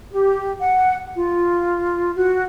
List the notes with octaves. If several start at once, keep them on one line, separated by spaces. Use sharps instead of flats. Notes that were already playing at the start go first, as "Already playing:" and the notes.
G4
F#5
F4
F#4